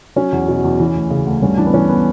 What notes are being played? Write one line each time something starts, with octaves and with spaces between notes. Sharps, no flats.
F#3 C#4
E2
B2
E2
E3
D2
C#3
D2
G2 C#4
E3 D4
B3
E3 C#4
B3